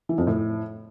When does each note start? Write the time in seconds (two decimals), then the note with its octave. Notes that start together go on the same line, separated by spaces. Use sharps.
0.09 E3
0.18 F2
0.27 A2